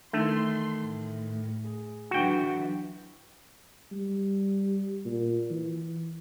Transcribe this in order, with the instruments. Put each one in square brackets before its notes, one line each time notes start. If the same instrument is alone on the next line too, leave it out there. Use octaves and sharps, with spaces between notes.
[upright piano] D#3 E3 [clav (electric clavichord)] A3 [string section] C6
[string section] A2
[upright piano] G#4
[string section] D3 E3 F#3 [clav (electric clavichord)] F#4 G5
[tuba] G3
A#2
E3